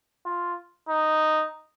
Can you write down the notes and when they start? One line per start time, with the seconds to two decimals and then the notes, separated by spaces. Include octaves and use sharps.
0.26 F4
0.89 D#4